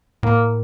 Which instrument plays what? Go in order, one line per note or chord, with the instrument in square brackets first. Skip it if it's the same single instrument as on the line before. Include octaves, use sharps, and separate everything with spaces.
[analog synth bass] A2 [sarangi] A#3